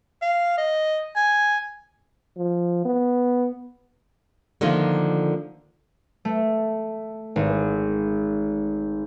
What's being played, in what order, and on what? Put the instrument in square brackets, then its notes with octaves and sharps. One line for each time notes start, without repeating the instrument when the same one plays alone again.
[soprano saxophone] F5
D#5
G#5
[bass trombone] F3
B3
[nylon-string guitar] D3 D#3 F3 A3 A#3
[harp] A3
G#1